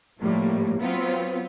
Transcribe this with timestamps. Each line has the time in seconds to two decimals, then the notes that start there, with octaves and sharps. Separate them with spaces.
0.20 A2 F3 G3 A#3
0.80 F#3 B3 C4 F4